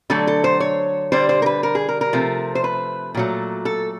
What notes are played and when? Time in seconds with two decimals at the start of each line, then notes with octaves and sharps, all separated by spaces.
0.10 D3 F#3 A3 A4
0.27 A4
0.44 C5
0.60 C#5
1.12 D3 G3 C5
1.29 C5
1.42 A#4
1.46 B4
1.63 A#4
1.75 G#4
1.88 A#4
2.01 A#4
2.13 C3 F3 A3
2.55 C5
2.64 B4
3.15 A#2 F#3 A3
3.65 A4